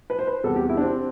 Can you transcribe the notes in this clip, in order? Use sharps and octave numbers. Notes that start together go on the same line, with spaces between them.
B4
C5
B4
E2 C3 G3 A4
G4
E4
D4
C4